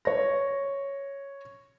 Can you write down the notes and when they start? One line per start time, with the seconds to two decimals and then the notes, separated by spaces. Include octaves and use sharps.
0.05 C#5 A#6